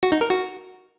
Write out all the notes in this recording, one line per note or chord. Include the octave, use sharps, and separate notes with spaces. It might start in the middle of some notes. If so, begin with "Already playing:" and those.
F#4
D#4
A#4
F#4